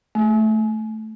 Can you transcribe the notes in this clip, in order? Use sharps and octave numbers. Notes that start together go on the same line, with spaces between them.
A3